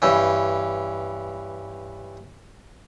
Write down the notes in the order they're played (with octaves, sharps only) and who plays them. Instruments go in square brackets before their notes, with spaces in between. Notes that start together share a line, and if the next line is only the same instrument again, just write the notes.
[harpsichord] G2 E3 C#4